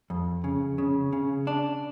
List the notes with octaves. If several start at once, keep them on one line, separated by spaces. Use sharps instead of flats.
F2
C#3
C#3
C#3
D4